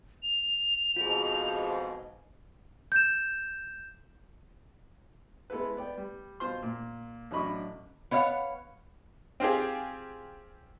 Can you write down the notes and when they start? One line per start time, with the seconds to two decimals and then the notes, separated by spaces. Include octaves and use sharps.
0.23 F7
0.97 F2 G#2 B2 F4 G#4
2.92 G6 E7
5.50 G#3 B3 E4 A4 B4
5.77 B3 D5 G5
5.97 G3
6.40 B2 F4 C5 C6
6.63 A#2
7.31 A1 F#3 D4 D#5 B5 C#6
8.11 B3 C#5 D5 F5 F#5
9.40 C4 F4 G4 G#4